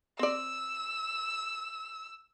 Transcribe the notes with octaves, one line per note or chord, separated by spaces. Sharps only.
C4 D5 E6